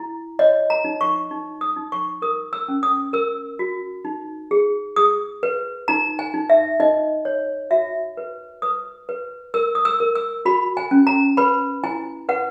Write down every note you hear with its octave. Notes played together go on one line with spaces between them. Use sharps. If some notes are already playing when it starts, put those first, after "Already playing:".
Already playing: E4
C#5 D#5
A#5
D#4
C#6
D#4
D#6
D#4
C#6
A#4 D#6
E6
C#4
D#6
A#4 E6
F#4
D#4
G#4
G#4 D#6
B4
D#4 A#5
G#5
D#4
E5
D#4 D#5
C#5
F#4 E5
B4
B4 D#6
B4
A#4 E6
D#6
E6
A#4
E6
F#4 B5
G#5
C#4
A#5
B4 B5
E4 G#5
B4 F#5